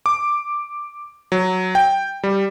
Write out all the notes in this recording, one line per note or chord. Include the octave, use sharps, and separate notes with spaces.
D6
F#3
G5
G3